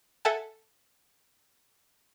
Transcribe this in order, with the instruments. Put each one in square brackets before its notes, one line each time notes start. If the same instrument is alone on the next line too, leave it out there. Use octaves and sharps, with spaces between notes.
[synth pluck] A4 E5 F#5 G#5 A5